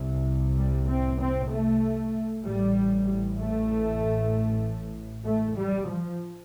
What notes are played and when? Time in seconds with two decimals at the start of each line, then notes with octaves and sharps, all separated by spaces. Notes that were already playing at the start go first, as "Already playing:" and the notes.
Already playing: C2 C3
0.57 G3
0.88 C4
1.20 C4
1.50 A3
2.44 A1 A2 G3
3.38 A3
5.25 A3
5.56 G3
5.88 F3